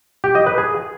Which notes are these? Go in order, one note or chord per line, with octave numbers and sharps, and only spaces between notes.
G4
D#5
B4
G#4